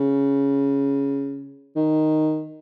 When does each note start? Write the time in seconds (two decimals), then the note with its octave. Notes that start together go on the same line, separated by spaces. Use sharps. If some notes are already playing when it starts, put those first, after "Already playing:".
Already playing: C#3
1.76 D#3